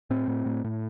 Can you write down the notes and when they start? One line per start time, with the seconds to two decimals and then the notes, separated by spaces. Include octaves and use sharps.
0.10 A2 C4
0.28 A2
0.46 A2
0.64 A2